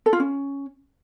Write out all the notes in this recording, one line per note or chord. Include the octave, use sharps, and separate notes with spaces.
A4
F4
C#4